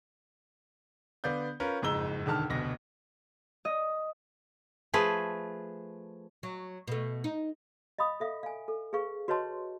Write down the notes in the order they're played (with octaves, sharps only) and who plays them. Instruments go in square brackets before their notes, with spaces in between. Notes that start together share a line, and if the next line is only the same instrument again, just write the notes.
[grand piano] D3 B3 D5 F5 G6
C#4 F4 A#4 B4
F#1 F2 G#2 A#5 E6 G7
E1 D3 D#3 A5 F6
F1 D2 B2 A#6
[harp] D#5
[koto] F3 A3 G#4 B4
[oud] F#3
B2 A3
D#4
[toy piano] D#5 F5 B5 D#6
A4 E5 F5
F5 G#5
A4
G#4 B4 F5 C#6
F#4 B4 C#5 D#5 A5 C6